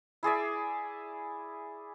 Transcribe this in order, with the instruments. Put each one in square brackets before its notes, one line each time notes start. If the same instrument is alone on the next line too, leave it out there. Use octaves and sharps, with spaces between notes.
[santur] E4 G#4 D5 E5